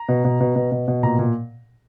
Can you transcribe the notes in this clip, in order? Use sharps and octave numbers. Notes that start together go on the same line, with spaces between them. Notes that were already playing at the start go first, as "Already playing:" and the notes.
Already playing: A#5
B2
B2
B2
B2
B2
B2
A#2 A#5
A#2